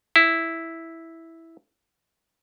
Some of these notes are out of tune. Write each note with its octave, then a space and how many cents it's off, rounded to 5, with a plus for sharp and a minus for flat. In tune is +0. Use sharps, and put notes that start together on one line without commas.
E4 -5